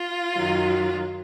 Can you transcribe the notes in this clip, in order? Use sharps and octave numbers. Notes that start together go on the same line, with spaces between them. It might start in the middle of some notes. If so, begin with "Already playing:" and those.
Already playing: F4
F#2 D#3 F#3